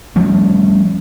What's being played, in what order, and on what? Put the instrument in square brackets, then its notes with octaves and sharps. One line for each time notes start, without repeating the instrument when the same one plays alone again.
[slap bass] F3 G3 A3 C#4